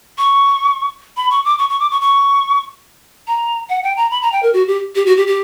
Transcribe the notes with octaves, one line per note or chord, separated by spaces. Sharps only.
C#6
B5
C#6
D6
C#6
C#6
D6
C#6
C#6
A#5
F#5
G5
A#5
B5
A#5
G5
A#4
F#4
G4
G4
F#4
G4
G4